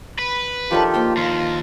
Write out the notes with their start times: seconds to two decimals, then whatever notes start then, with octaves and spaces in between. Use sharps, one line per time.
0.19 B4
0.71 D#3 F3 D4 F4 G4 A4
0.94 A#3 C5 G5
1.17 D#2 F4